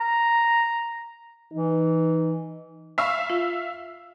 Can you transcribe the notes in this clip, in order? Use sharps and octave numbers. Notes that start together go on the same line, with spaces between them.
A#5
E3 D#4
E5 F5 B5 C#6 E6 F6
F4